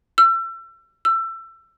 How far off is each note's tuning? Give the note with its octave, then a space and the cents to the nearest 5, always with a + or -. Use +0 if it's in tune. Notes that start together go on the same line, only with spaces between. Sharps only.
E6 +35
E6 +25